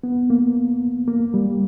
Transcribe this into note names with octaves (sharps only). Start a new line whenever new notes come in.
B3
A#3
A#3
G3